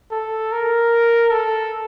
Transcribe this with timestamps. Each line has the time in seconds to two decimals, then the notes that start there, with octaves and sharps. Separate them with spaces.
0.12 A4
0.52 A#4
1.31 A4